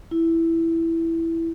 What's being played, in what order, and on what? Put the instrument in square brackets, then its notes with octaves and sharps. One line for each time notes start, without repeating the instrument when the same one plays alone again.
[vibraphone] E4